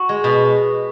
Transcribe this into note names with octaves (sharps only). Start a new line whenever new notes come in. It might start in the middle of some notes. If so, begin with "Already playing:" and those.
Already playing: F#4
G#3
B2